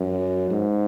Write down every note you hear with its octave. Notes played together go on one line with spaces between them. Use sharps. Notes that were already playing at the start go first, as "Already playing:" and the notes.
Already playing: F#2
G#2